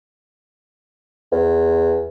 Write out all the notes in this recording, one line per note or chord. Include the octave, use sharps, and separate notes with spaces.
E2